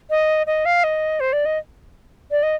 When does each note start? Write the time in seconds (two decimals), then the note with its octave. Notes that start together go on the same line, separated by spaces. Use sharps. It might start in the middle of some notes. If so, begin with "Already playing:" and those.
0.10 D#5
0.47 D#5
0.65 F5
0.84 D#5
1.20 C5
1.33 D5
1.45 D#5
2.31 D5
2.43 D#5